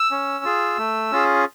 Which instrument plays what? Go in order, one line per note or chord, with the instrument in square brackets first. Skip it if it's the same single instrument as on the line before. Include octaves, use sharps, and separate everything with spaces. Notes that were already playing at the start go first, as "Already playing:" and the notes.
Already playing: [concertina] E6
C#4
F4 G#4
A3
C#4 F4 G#4